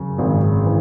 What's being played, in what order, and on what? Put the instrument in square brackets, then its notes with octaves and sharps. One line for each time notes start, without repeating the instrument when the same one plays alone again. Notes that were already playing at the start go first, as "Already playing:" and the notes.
Already playing: [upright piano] F#2 C#3
G#1
E3